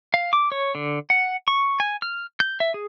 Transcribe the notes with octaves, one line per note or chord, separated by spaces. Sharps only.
F5
D6
C#5
D3
F#5
C#6
G#5
F6
G6
E5
G#4